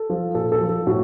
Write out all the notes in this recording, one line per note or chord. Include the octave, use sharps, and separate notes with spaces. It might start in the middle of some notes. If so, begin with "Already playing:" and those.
Already playing: A4
F3
A#2 A4
A4
F3
A4
A2 F#4